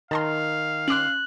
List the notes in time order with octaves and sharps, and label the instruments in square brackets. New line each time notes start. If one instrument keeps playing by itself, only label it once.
[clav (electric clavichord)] D#3 [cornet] F5 [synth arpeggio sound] A5 A#5 C6
[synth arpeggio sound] C#4 C6 D6 [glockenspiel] F#6 F#7